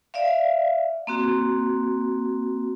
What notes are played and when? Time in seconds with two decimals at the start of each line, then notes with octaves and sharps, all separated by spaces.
0.14 D5 E5 F5
1.07 A#3 C4 F#4